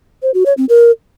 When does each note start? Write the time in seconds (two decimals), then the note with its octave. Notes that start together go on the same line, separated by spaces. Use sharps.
0.23 C5
0.34 F#4
0.46 C#5
0.57 C4
0.69 A#4